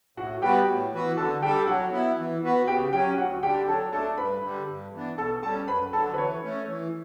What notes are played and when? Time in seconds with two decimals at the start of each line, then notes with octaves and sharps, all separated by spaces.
0.17 A2 F#4 F#5
0.42 G3 B3 F#4 G4 B4 G5
0.67 A2
0.93 E3 B3 F#4 B4
1.17 D3 A4 A5
1.42 G3 D4 G4 A4 G5
1.67 F#3 F#4 F#5
1.92 B3 E4
2.18 E3
2.43 B3 F#4 B4
2.67 C#3 G4 G5
2.92 F#3 C#4 G4 G5
3.17 D2 F#4 F#5
3.43 D3 G3 D4 G4 G5
3.67 F#3 A4 A5
3.92 A3 D4 A4 A5
4.17 G2 B4 B5
4.43 D3 G3
4.68 G2
4.93 E3 B3 D4
5.18 B2 A4 A5
5.42 G3 A4 A5
5.46 C#4
5.67 F#2 B4 B5
5.92 D3 F#3 A4 A5
6.14 B4
6.18 E3 C#5
6.43 A3 C#4
6.68 E3